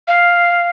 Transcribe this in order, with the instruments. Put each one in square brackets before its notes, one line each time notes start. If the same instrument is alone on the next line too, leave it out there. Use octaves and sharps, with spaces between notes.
[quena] F5